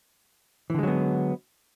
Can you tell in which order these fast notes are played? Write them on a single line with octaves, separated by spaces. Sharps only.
E3 D3 G#3 F#3 B3